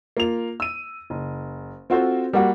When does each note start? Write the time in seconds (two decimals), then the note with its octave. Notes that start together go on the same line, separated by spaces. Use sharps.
0.17 A#3 F4 F7
0.60 E6 D#7
1.10 F#1
1.90 C4 F4 F#4 A4 C5
2.33 G3 A#3 F#4 F#5